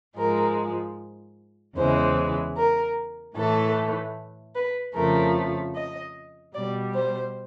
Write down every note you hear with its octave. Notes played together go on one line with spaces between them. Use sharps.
G#2 F3 G#3 A#4
E2 C#3 E3 G#3 C5
A#4
A2 E3 A3 A4
B4
F2 C#3 F3 A3 A#4
D#5
B2 G3 D5
C5